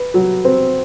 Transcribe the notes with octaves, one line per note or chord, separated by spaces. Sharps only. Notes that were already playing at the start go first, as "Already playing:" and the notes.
Already playing: B4
F#3
C4